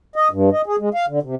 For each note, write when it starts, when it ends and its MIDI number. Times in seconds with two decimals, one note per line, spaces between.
0.16 0.28 75
0.31 0.50 43
0.53 0.62 75
0.66 0.76 68
0.79 0.89 56
0.94 1.06 77
1.08 1.19 50
1.23 1.35 48